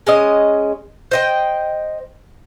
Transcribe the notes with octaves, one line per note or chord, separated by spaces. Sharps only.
G#3 C#4 D#5
C5 D#5 G5